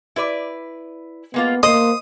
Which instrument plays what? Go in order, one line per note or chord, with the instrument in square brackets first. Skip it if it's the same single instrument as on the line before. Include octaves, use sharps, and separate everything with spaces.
[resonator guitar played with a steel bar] E4 B4 D5
[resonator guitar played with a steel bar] G#3 A#3 F4 [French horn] B3
[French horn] A#3 [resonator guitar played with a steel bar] C5 [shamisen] D#5 [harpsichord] D#6